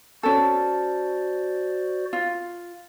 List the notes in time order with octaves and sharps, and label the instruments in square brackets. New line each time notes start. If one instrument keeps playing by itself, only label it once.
[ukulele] C#4 A4 [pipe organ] F#4 C5 D5
[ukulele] F4